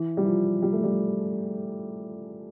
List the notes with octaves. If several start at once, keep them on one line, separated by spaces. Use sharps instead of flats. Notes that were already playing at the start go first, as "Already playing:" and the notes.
Already playing: E3
G3
F3
G3
A3
G3